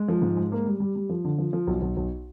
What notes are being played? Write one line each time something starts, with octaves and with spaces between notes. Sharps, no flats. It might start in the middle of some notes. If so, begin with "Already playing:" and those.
Already playing: G#3
F3
G#2
G#3
A#3
G3
G3
G3
F3
D3
F3
F3
B1
B1
B1